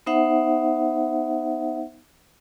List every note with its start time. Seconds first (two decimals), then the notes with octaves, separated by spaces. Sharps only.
0.06 B3 D#4 C5 E5 F#5